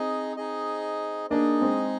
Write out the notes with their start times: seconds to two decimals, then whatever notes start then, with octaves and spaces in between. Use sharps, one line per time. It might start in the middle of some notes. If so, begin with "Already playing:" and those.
Already playing: C4 D#4 G#4 D#5
0.37 D#4 G#4 D#5
1.30 A#3 D4 D#4 G#4 D#5
1.61 G#3 C4